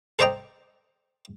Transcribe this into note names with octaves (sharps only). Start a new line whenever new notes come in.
A4 C5 D5 D#5 G5 A#5